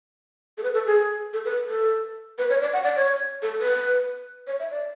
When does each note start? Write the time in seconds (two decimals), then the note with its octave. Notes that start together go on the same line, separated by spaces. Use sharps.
0.58 A4
0.63 B4
0.74 A4
0.87 G#4
1.33 A4
1.45 B4
1.67 A4
2.38 B4
2.50 C#5
2.61 D5
2.73 F#5
2.84 D5
2.96 C#5
3.42 A4
3.61 B4
4.47 C#5
4.60 E5
4.71 D5